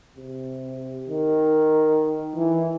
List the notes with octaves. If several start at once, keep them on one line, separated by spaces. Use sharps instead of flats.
C3
D#3
E3